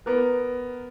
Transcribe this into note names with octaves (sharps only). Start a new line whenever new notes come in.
B3 A#4